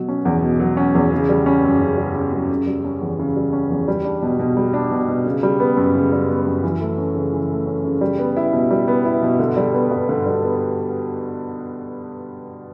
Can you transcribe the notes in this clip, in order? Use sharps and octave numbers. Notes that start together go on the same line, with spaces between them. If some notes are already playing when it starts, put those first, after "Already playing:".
Already playing: B2 F#3
C#4
E2
B2
F#3
C#4
E2
C#3
G3
C#4
F#2
C#3
G3
C#4
F#2
C#3
G3
C#4
E2
C#3
G3
C#4
E2
G3
D4
B2
B2
G3
D4
B2
B2
C#3
G3
B3
F#2
C#3
G3
B3
F#2
E3
A3
C#4
C#3
E3
A3
C#4
C#3
G3
B3
E4
B2
G3
B3
E4
B2
D3
G3
B3
G2
D3
G3
B3